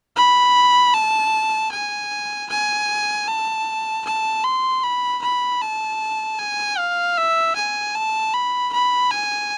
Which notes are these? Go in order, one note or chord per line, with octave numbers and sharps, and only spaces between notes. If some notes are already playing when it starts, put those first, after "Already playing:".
B5
A5
G#5
G#5
A5
A5
C6
B5
B5
A5
G#5
F5
E5
G#5
A5
B5
B5
G#5